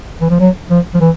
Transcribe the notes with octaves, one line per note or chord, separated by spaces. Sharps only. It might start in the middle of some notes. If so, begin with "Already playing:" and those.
E3
F3
F#3
F3
F3
E3